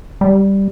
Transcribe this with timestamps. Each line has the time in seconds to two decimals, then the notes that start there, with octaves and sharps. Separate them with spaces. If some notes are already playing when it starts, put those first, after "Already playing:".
0.21 G3